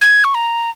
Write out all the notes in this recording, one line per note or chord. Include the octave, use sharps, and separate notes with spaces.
G#6
C#6
A#5